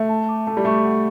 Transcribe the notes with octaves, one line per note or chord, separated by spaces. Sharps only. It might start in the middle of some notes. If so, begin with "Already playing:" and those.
Already playing: A3 E5
A5
D6
A3 A5
G3
A3 C#6
F#5